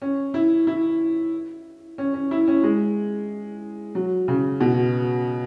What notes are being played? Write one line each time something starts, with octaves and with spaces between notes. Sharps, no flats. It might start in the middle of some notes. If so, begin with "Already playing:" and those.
C#4
E4
E4
C#4
C#4
E4
C#4
G#3
F#3
C#3
B2